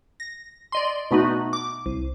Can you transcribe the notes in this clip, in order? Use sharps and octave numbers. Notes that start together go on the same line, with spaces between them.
A#6
D5 D#5 C6
B2 A3 B3 D#4 F#4
D6
C2